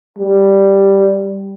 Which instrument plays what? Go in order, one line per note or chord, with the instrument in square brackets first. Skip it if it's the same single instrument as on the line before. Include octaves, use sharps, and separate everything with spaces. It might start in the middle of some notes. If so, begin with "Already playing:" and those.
[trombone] G3